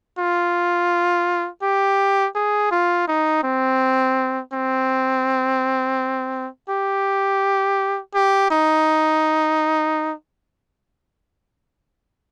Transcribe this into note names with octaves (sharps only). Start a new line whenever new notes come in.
F4
G4
G#4
F4
D#4
C4
C4
G4
G4
D#4